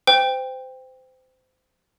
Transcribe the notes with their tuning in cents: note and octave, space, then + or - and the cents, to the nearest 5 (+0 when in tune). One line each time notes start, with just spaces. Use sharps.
C5 -25 G5 +15